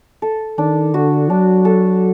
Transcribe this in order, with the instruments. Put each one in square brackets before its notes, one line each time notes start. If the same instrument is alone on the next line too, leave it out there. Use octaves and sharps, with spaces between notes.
[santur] A4
[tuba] D#3 [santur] D4
[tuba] D3 [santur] F#4
[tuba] F#3 [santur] D4
[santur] A4